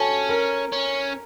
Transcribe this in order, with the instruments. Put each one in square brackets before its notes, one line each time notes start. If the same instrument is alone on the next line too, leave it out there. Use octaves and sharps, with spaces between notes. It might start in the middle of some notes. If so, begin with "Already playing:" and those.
Already playing: [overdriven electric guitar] C#4 [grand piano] F#4 A4 G#5 A5
[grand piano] A#4 A#5
[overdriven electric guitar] C#4